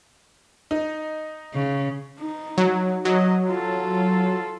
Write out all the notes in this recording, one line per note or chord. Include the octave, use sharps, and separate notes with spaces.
D#4
C#3
D#4
F#3
F#3 D#5
F4 A4